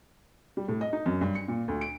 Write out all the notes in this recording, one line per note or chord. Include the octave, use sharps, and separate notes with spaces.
G3
A2
D#5
D#4
F#2
G2
C#7
A#2
D2
D7